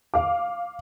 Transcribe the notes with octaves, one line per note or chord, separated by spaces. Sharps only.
F5 D6